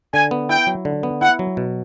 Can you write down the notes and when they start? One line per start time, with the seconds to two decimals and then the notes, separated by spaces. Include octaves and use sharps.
0.14 D3 G#5
0.31 B3
0.49 E4 G5
0.67 F#3
0.85 D3
1.03 B3
1.21 E4 F#5
1.39 F#3
1.57 B2